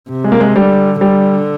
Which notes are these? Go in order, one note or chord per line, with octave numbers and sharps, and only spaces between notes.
C3
G#3
A#3
G#3
D3 G3
D3 G3